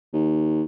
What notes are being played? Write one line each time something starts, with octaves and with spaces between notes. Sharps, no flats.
D#2